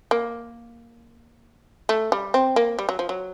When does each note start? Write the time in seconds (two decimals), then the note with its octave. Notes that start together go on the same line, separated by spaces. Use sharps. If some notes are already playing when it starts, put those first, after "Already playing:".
0.11 A#3
1.89 A3
2.12 G3
2.34 C4
2.56 A#3
2.79 G3
2.89 F#3
2.99 F3
3.09 F#3